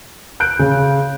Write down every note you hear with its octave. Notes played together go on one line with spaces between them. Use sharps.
F#6 G6 D7
C#3